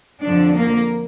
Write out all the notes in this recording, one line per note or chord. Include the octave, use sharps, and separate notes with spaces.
F2 D3 F3 D4
A#3